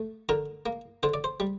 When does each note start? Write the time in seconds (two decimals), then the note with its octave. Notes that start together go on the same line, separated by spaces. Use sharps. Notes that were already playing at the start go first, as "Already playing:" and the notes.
Already playing: A3
0.29 D3 A#4
0.66 A#3
1.03 D3 C5
1.14 D5
1.24 C5
1.40 G3